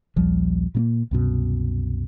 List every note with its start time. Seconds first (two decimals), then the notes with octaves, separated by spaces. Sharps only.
0.16 A#1 D#2 F3 G3
0.75 A#2 A3 A#3
1.11 C2 F#2 B2